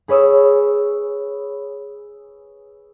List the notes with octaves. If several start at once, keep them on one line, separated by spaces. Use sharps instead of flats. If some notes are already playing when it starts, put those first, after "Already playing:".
G#4 B4 C#5 D#6 E6